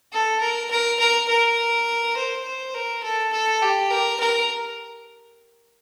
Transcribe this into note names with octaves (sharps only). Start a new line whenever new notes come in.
A4
A#4
A#4
A#4
A#4
C5
C5
A#4
A4
A4
G4
A#4
A#4